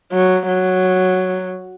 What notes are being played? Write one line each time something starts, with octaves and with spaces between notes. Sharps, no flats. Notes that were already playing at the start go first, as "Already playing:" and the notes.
F#3
F#3